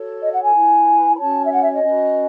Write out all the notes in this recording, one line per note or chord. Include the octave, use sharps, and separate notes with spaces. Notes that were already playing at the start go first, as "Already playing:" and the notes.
Already playing: F#4 A4 C#5
D#5
F#5
G#5
E4 B4
B5
C#4 F#4 C#5 A5
E5
F#5
E5
D#5
C#4 F#4 B4